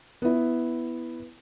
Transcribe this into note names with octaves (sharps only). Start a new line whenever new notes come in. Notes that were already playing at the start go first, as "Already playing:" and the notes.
B3 E4